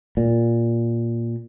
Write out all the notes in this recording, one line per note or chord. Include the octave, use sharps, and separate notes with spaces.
A#2